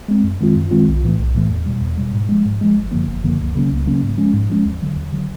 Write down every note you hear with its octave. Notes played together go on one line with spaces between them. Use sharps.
G#3 C4
F#2
D#3 G#3 C4 F4
F#2
D#3 G#3 C4 F4
B1
A2 E3 A3
B1
A2 E3 A3
E2
B2 G3
E2
B2 G3
G#2
F3 G#3
G#2
F3 G#3
G1
F#2 D3 F3 A#3
G1
F#2 D3 F3 A#3
C#2
C#3 F#3 A#3 C#4
C#2
C#3 F#3 A#3 C#4
G#2
F3 G#3 C#4
G#2
F3 G#3 C#4
D#2
D3 F#3
D#2
D3 F#3